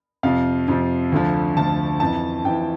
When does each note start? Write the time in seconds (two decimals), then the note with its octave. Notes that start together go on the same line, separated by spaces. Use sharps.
0.23 F2 C3 F3 F5
0.68 F2 C3 F3
1.12 D2 D3 F3
1.56 D2 D3 F3 A5
2.00 F2 E3 A5
2.45 F2 E3 G5